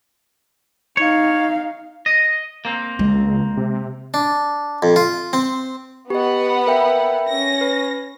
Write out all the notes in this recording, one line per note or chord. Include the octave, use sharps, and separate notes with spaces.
D#4 C#5 F5
D#5
A#3 C4
C#2 G#3
C3
D4
F2
F4
C4
B3 G4 D#5 F#5
A#4 E5 G5
C#4 A#6
B4